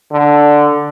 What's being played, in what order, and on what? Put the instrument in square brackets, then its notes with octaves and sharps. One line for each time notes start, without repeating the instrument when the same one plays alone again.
[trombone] D3